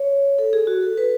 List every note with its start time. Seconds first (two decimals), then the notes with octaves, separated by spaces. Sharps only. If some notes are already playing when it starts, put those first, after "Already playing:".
Already playing: C#5
0.39 A4
0.53 G#4
0.67 F#4
0.82 A4
0.97 B4